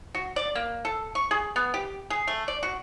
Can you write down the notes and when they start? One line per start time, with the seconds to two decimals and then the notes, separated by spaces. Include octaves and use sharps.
0.14 F#4
0.36 D5
0.55 A#3
0.85 A4
1.15 C#6
1.31 G#4
1.56 B3
1.74 G4
2.10 G#4
2.27 A3
2.48 D5
2.63 F#4